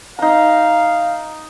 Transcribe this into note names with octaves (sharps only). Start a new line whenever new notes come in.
D#4 F5 A#5